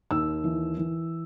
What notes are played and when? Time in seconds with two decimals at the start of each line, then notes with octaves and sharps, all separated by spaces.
0.11 D#2 E6
0.44 E3
0.77 E3